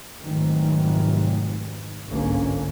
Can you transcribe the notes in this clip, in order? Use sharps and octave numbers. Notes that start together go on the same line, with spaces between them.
F1 G#2 D#3 E3 F#3
G1 C2 G#2 D3 A#3 C#4